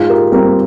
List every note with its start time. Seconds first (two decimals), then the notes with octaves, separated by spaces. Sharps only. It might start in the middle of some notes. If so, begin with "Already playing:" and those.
Already playing: G#2 F4 G#4
0.09 G4 A#4
0.32 G3 C4 G4 A#4